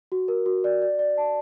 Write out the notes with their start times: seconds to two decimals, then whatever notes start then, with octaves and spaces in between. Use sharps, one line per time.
0.12 F#4
0.28 A#4
0.46 F#4
0.64 D5
0.82 D5
0.99 D5
1.18 A5